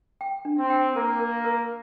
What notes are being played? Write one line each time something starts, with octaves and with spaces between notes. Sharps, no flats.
G5
D4
C4
G5
A#3 A#4
A#4
A#4